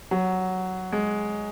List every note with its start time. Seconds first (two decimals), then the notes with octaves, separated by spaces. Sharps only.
0.11 F#3
0.93 G#3